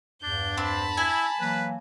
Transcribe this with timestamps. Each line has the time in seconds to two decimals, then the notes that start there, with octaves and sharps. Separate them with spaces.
0.23 E2 G2 D4 G6
0.58 C4 A5 B5
0.97 E4 G#5
1.41 E3 F#3 A#3 B4